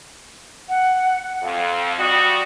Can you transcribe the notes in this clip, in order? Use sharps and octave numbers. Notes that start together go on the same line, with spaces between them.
F#5
F2 F5
G3 F#4 D#6